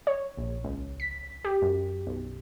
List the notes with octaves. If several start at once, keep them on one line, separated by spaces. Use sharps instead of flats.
C#5
A#1
C#2
B6
G4
F#2
B1